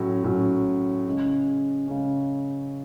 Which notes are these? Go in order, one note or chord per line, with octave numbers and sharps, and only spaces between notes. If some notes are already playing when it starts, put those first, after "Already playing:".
Already playing: A2 F#3 C#4
A2 F#3 C#4
C#3 G#3 C#4
C#3 G#3 C#4